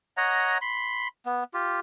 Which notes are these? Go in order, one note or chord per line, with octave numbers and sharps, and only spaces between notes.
C#5 D#5 F#5 A#5
B5 C6
B3
F4 G4